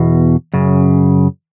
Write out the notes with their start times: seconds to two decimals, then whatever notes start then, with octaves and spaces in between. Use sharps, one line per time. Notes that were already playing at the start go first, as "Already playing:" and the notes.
Already playing: E2 B2
0.54 F#2 C#3